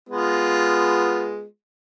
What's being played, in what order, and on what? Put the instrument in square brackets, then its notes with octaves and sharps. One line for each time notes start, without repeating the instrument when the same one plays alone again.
[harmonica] G#3 B3 F4